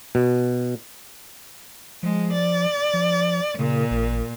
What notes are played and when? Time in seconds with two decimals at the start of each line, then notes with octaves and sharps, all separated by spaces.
0.15 B2
2.03 F3 G#3
2.33 D5
2.94 F3
3.59 A#2 C#3
3.91 A1